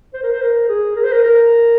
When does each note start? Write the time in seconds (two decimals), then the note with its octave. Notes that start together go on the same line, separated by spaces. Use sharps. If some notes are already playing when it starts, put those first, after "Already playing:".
0.14 C5
0.23 A#4
0.32 C5
0.42 A#4
0.69 G#4
0.96 A#4
1.04 C5
1.12 A#4
1.24 A#4